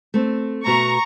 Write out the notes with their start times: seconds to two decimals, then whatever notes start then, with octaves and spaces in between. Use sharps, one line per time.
0.14 A3 C4
0.66 B2 F#4 E5 A#5 C#6